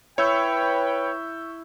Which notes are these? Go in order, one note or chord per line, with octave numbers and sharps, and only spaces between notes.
E4 B4 C#5 G5 C#6 E6 G6